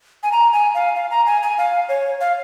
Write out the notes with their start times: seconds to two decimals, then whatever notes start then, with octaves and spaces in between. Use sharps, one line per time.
0.23 G#5
0.32 A#5
0.53 G#5
0.75 F5
0.95 F5
1.11 A#5
1.27 G#5
1.43 G#5
1.58 F5
1.89 C#5
2.21 F5